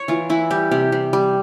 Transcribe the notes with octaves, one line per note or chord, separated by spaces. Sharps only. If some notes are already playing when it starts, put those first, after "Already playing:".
Already playing: C#5
E3 F4
E3 E4
G3 G4
C3 G4
C3
G3